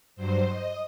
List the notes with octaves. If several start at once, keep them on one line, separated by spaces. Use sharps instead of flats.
G2 F#3 C5
D#5